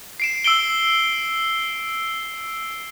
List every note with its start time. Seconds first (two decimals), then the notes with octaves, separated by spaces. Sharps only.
0.20 C7 D7 E7
0.44 E6 C7 D7 G7